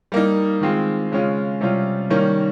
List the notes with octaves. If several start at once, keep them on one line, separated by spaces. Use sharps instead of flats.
G3 A#3 D#4
D#3 G#3 C4 F4
C#3 G#3 C#4 F4
C3 G3 C#4 F4
D#3 G3 A#3 C#4